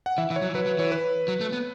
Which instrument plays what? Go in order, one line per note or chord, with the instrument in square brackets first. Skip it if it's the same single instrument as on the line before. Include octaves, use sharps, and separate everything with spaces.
[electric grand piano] F#5
[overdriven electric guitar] E3 [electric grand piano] E5
[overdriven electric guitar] E3 [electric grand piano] E5
[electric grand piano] C#5
[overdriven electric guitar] F#3
E3
[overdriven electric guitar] F#3 [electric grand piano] B4
[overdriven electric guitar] F#3
[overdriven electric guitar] E3 [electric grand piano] C#5
[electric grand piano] B4
[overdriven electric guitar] F#3
A3
B3